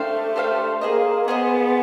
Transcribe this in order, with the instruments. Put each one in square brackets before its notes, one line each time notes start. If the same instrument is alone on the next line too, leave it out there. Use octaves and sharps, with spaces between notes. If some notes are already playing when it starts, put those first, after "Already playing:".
Already playing: [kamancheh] A3 [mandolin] D4 G4 C5 F5
[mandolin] D4 G4 C5 F5
[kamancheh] A#3 [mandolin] G#4 C5 D#5
[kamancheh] B3 [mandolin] G#4 C5 D#5